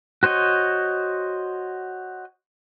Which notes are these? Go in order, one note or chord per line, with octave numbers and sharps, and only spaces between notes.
F#4 C5 C#5 D#5